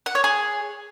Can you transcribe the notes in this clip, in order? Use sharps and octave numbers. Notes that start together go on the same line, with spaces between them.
F#5
C#5
G#4